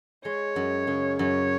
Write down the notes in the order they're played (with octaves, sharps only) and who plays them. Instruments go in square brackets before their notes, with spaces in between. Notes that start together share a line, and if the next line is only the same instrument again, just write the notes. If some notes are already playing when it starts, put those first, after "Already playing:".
[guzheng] G#3 [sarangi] C#5
[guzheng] F#2
C#3
[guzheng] F#2 [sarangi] C#5